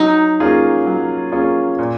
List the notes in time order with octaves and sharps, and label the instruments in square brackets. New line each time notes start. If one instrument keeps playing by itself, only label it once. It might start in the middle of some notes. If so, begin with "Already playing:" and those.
Already playing: [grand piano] F#3 [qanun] D#4
[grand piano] A#3 C#4 F4 G#4
F#3
A#3 C#4 F4 G#4
A#2